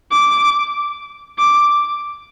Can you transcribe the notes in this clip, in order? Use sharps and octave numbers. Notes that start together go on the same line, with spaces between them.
D6
D6